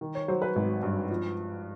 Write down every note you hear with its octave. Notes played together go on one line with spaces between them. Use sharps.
D#3
C#5
F#3 C5
B4
G#1
G2
F3